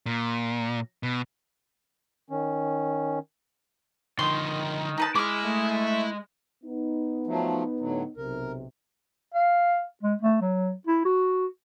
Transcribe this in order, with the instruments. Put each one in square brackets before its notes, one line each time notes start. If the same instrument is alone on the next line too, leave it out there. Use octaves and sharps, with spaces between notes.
[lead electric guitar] A#2
B2
[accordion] D#3 C#4
[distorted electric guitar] D3 F3 [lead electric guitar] D#3 [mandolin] C6
[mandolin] D#4 B4 A5
[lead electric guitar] G#3 [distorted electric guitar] E4 [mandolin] D6 F6
[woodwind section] A3
[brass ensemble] B3 D#4
[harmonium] F3 F#3 A3
A2 D3 F#3
[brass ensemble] B1 C3 [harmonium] A#4
[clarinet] F5
G#3
A3
F#3
E4
F#4